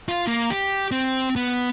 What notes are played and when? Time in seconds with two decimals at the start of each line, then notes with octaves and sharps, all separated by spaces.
0.09 F4
0.27 A#3
0.50 G4
0.92 C4
1.36 B3